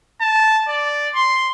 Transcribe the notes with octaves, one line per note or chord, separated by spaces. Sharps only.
A5
D5
C6